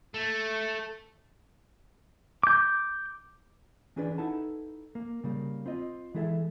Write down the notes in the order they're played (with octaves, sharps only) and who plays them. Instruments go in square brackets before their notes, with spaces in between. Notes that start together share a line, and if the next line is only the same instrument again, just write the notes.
[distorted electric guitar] A3
[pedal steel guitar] D6 G6
[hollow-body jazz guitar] E3 C#4 D4 G#4 B4 D5
D#4 E4 A4 B4 F#5 A5
A#3
C#3 G3 A#3
C4 F4 D#5
E3 G#3 E4 G#4 A4 E5